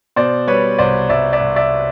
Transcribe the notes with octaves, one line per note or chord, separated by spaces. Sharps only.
B2 C5 D5
G3 B4 C#5
C2 C5 D5
C2 D5 E5
D5 E5
C2
D5 E5